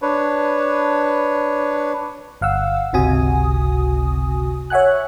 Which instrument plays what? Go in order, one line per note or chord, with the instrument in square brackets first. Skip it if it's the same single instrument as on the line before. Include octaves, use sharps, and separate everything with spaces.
[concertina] D4 B4 C#5
[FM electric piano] G1 F5 F#5 E6
G1 C#2 C3 F#4 G#5 D#6
C#5 E5 F#5 G#5 F#6